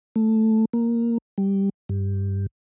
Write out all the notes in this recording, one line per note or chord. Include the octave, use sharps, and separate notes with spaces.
A3
A#3
G3
G2